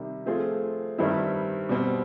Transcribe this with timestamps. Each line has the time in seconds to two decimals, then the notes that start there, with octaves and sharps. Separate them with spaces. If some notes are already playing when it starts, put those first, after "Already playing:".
Already playing: C3 D#3 G3
0.26 F3 A3 C4 F4 G#4
0.98 G2 D#3 G3 C4 E4
1.69 B2 G3 C4